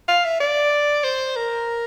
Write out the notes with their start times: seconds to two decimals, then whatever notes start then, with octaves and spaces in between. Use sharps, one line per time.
0.08 F5
0.25 E5
0.40 D5
1.04 C5
1.36 A#4